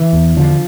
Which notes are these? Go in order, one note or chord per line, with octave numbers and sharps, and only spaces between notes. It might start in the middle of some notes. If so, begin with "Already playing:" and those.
Already playing: E3
E2
D3 F3